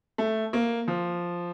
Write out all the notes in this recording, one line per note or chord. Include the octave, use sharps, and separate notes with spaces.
A3
A#3
F3